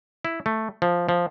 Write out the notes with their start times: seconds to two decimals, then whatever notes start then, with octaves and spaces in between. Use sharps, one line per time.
0.25 E4
0.46 A3
0.82 F3
1.09 F3